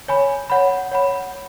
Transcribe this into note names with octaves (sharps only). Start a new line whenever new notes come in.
C#5 G#5 B5
C#5 F#5 B5
C#5 F#5 B5